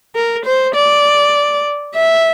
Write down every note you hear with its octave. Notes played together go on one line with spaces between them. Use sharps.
A#4
C5
D5
E5